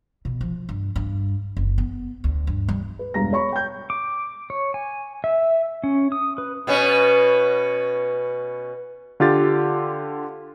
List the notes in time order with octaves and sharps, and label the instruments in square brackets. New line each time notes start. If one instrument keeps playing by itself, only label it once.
[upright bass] B2
F3
G2
G2
F#1
B3
D2
G2
G3
[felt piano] B4
E1 G2 A#5 A#6
C#5 B5 C#6
G5 G6
[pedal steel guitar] D6
C#5
G#5
E5
C#4
D#6
B4
[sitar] B2 B3 C#4
[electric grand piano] D3 F4 G4 A6